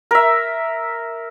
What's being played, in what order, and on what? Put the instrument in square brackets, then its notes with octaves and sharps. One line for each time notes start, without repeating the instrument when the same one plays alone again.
[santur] A#4 E5